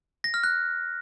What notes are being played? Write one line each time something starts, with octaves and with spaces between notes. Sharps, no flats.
A#6
F6
F#6